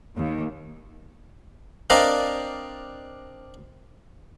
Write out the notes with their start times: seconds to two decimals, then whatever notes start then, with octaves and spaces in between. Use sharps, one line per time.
0.15 D#2
1.90 C4 D4 A#4 D5 D#5 F5